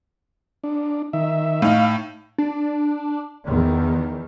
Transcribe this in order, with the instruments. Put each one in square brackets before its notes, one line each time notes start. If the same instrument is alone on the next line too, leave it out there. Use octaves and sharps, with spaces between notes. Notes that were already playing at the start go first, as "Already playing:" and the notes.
[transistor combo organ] D4
D#3 E5
[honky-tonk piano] A2 D#4 [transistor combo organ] F5
[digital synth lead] D4
[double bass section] E2 D#3